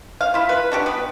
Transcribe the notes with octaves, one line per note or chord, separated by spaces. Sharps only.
F5
E4 F4
B4
D4 F#4 G4
B3 B4